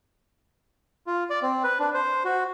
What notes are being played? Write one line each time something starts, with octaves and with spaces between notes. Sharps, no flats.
F4
D5
C4
B4
D4
C5
F#4